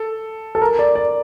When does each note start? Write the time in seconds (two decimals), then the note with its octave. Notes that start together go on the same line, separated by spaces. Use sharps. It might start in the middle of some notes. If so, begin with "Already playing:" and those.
Already playing: A4
0.55 A4
0.62 A#4
0.79 D5
0.95 D5